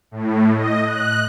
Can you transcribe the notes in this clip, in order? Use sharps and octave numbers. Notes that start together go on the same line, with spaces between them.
A2
D#5
F#6